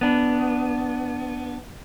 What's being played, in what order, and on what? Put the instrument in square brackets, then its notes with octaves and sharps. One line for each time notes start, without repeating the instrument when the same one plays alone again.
[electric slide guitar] B3 D4